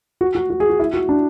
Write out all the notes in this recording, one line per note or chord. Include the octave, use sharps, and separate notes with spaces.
F#4
F#4
F#4
G#4
F#4
E4
F#4
D4